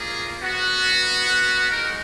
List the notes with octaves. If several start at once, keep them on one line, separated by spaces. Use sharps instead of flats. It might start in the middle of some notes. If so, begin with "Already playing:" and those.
Already playing: A#3 F4 G#4
B3 F#4
G#3 D#4 F#4 A#4